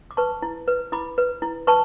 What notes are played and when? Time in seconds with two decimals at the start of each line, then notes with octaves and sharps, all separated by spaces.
0.11 D6
0.17 B4 A5 C#6
0.42 E4
0.68 B4
0.92 E4 B5 D6
1.18 B4
1.42 E4
1.67 B4 A5 C#6